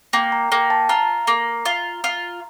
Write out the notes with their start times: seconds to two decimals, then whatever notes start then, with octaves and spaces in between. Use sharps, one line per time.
0.13 A#3 G5
0.32 A#5
0.52 A#3 G5
0.70 A5
0.89 F4 A#5
1.27 A#3
1.65 F4
2.04 F4